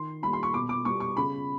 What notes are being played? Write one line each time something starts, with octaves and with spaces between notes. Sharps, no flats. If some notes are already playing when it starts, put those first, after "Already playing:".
Already playing: D#3 C6
G3 A#3 B5
C6
C#6
B2 D6
D6
G3 B3 C#6
C#6
C#3 B5